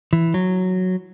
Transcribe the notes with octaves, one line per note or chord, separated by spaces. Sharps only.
E3
F#3